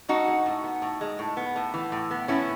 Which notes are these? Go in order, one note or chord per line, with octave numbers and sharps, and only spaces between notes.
A2 D#4 F#4
G#3
A2
B3
A2
G#3
A2
B3
A2
E3
A2
B3
A2 C#4 E4